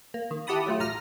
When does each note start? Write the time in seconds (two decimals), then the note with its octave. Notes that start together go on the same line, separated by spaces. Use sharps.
0.14 A#3
0.31 D#3
0.47 E4 G4 F#5 A5 B5 D#6
0.66 F#3 A3 F4
0.80 A1 A#5 F6 A#6